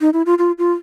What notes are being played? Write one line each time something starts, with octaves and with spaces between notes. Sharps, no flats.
D#4
E4
F4
F4
F4